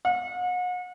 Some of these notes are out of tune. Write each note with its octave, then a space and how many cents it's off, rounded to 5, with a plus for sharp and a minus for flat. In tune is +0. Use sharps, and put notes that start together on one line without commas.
F#5 -40